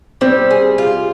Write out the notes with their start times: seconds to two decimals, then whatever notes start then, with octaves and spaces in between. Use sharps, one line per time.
0.21 G3 C4
0.51 G#4
0.78 F4